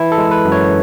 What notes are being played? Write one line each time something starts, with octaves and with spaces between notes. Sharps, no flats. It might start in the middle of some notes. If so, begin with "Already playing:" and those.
Already playing: E3 E4
A4
G#3
B4
F#2
C#5